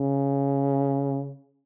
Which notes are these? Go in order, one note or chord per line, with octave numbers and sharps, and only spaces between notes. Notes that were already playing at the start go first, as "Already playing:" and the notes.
Already playing: C#3